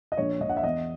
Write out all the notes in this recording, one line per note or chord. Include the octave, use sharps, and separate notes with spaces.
D#5
A#1 C#5
A#1 D#5
F#5
E5
E2 D#5